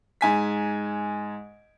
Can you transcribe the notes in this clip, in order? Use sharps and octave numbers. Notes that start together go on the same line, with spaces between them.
G#2 G#5 B6